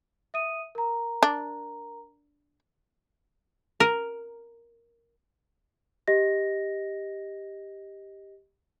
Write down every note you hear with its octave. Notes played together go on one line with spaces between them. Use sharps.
E5 D#6 D#7
A#4 A#5
D4
A#4
G4 D#5 A#6